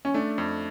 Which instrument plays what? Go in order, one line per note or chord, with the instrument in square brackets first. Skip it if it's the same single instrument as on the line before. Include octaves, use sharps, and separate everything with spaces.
[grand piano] C#4
[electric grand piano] A3 [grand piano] D4
[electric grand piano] F2